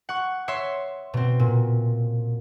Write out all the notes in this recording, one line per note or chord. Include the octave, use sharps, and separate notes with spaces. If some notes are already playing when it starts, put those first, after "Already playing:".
F#5 C#6
C#5 E5 C6 C#6
B2 C4
A#2